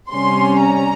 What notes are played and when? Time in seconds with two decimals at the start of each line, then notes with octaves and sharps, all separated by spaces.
0.11 C3 G3 C#4 C6
0.63 A#5